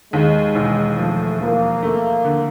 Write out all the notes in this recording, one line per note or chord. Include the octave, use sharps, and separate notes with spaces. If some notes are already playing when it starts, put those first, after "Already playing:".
D#2 G#3
E1
F3 A3
F3 A#3
A3
D3